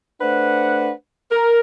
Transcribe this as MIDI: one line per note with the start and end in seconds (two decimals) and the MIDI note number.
0.21 0.90 57
0.21 0.90 62
0.21 0.90 71
0.21 0.90 72
0.21 0.90 78
1.32 1.60 70